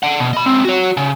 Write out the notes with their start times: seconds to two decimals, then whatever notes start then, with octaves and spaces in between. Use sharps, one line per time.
0.03 D5 F#5
0.20 B2
0.33 D#5 B5
0.46 C#2 C4
0.65 F#4 C#5
0.97 C#3